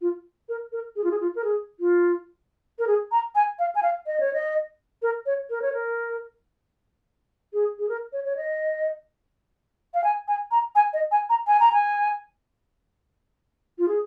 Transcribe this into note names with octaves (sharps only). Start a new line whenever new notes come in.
F4
A#4
A#4
G#4
F4
G#4
F4
A#4
G#4
F4
A#4
G#4
A#5
G#5
F5
G#5
F5
D#5
C#5
D#5
A#4
C#5
A#4
C#5
A#4
G#4
G#4
A#4
C#5
C#5
D#5
F5
G#5
G#5
A#5
G#5
D#5
G#5
A#5
G#5
A#5
G#5
F4
G#4